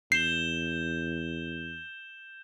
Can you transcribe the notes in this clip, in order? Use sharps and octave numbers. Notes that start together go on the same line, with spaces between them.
E2 G6 C7 E7 G7